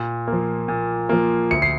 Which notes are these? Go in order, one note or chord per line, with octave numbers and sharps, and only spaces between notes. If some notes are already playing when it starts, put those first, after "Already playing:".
Already playing: A#2
F3 A#3
A#2
F3 A#3
D2 C#7
C7